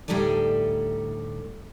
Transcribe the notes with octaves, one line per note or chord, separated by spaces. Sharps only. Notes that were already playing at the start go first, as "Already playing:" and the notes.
D2 A2 G3 D#4 A4 D5